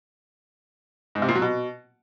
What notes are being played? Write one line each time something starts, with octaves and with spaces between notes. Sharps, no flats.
G#2
C3
A#2
F#3
B2